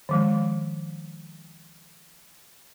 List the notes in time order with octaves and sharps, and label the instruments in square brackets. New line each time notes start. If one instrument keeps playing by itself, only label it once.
[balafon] D#3 F3 G#3